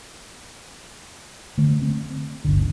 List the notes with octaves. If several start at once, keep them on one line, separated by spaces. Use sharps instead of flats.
D3 A3
C4
G1 D2 D3